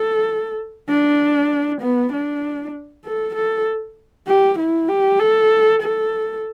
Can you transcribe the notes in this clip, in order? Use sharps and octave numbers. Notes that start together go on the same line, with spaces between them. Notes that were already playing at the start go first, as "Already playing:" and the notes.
Already playing: A4
D4
B3
D4
A4
A4
G4
E4
G4
A4
A4